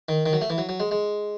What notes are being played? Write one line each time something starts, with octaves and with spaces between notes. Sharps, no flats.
D#3
D#3
F#3
A3
E3
F#3
F#3
G#3
G#3